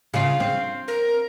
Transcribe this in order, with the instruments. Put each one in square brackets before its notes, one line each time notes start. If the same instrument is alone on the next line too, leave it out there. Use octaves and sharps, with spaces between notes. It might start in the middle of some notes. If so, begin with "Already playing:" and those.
[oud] C#3 F4 [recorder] F5
[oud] C4
[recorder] A#4